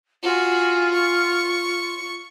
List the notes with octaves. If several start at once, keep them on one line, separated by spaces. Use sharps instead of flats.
F4 F#4 G#4
C#6